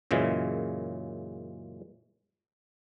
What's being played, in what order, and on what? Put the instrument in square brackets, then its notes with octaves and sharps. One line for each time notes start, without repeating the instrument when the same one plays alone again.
[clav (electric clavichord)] F#2 A#2 C#3 E3 G#3